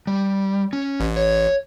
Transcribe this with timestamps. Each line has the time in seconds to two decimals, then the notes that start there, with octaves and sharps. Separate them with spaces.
0.07 G3
0.73 C#4
1.00 A1
1.17 C#5